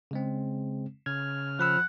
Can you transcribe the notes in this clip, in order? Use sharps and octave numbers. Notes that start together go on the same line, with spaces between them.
C#3 G#3 C4
C#3 F6 G#6
F3 F#5 B5 E6